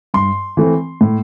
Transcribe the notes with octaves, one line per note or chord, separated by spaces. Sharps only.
G2 C6
E3 A3 C4
A2